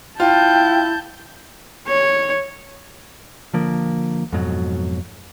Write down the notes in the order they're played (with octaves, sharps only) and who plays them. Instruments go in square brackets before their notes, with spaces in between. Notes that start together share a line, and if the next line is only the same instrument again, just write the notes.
[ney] E4 [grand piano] F4 [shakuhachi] G5 [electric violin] A5 G6
[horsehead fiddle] C#5
[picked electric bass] D3 F3 A#3
F2 G#2 B2 F#3